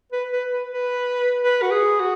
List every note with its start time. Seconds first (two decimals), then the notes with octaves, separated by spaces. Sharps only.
0.12 B4
0.33 B4
0.52 B4
0.72 B4
1.43 B4
1.62 F#4
1.72 G#4
2.00 F#4